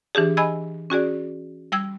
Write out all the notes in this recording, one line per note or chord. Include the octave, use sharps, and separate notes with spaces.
E3 D4 G4 G#4
D#5 G#5 B5 E6 G#6
C#4 F#4 G#4 D5
G3 G5 E6 G#6